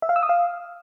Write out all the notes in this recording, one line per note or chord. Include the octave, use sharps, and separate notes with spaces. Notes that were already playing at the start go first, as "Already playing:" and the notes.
E5
F5
E6
D#6
F5